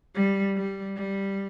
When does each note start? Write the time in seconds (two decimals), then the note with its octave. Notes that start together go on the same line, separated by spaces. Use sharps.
0.15 G3
0.56 G3
0.97 G3